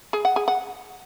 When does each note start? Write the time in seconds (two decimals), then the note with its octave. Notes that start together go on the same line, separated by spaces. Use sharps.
0.13 G#4
0.25 F#5
0.36 G#4
0.48 F#5